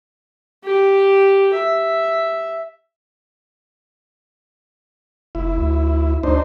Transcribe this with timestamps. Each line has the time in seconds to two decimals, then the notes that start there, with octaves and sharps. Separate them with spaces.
0.64 G4
1.54 E5
5.35 F1 E4
5.57 D2
6.23 D2 D4 D#4 C5